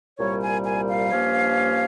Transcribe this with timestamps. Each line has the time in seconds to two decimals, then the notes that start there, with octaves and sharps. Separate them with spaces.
0.18 C2 A#2 G3 C#5
0.42 G#5
0.64 G#5
0.89 F5
1.11 G2 F3 A#3 C#4